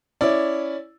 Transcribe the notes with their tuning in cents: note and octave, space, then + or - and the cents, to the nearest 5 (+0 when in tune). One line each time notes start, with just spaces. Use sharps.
C#4 +0 E4 +0 D5 +0